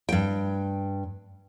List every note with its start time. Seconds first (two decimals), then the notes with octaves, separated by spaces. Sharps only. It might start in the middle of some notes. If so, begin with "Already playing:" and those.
0.09 G2 G5